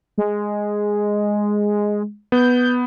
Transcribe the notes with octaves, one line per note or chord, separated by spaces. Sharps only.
G#3
B3 G6